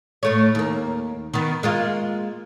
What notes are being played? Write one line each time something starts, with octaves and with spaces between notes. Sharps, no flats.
A2 A3 C#5
D#2 A#3
D#3 B3
G#3 A#3 F4